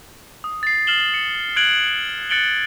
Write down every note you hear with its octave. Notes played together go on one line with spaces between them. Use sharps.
D#6
A6 C7
F6 C7 E7 F#7 G7
C#7
F#6 G#6 D7 F#7
F#6 A6 C#7 D7 F#7 G7